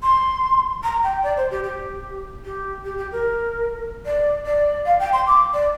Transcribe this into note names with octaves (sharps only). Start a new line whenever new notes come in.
C6
A#5
G5
D5
C5
G4
G4
G4
G4
G4
A#4
D5
D5
F5
G5
C6
D6
D5